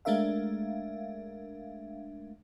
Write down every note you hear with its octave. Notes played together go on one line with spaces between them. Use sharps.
G#3 A3 D4 A#4 E5 F5